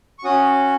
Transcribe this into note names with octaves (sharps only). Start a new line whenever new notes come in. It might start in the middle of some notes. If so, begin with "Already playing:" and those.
C#6
C#4 F#4 D#6